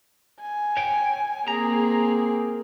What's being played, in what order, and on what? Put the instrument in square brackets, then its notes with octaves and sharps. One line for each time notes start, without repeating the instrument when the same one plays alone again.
[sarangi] G#5
[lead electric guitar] C#5 G5
[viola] A#3 C4 [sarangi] G#4 [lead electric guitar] A#5